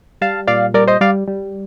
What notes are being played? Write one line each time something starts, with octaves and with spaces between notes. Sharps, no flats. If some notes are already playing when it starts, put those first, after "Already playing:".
G3 F5 A5
A#2 D5 F5
G3 A#4 D5
C5 D#5
G3 D5 F5
G3